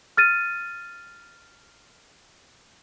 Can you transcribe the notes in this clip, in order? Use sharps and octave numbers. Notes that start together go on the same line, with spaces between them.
F6 A6 D#7